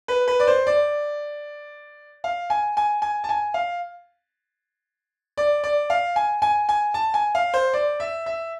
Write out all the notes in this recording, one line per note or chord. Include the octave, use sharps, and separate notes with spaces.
B4
B4
D5
C5
D5
F5
G#5
G#5
G#5
A5
G#5
F5
D5
D5
F5
G#5
G#5
G#5
A5
G#5
F5
C5
D5
E5
E5